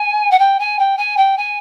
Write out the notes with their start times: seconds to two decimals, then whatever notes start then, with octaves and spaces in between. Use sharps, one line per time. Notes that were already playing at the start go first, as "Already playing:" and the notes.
Already playing: G#5
0.31 F#5
0.39 G5
0.59 G#5
0.79 G5
0.97 G#5
1.17 G5
1.37 G#5